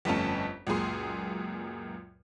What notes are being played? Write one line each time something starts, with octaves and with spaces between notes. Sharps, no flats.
G1 F2 A3 C#4 A5
C#2 F#2 A#2 G#4 C6